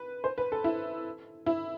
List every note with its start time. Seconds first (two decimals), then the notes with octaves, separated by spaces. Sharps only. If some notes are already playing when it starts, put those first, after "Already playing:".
Already playing: B4
0.24 C5
0.38 B4
0.52 A4
0.64 E4
1.46 E4